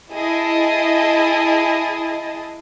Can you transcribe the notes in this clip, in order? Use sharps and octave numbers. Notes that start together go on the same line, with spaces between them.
E4 G#4 D#5 A5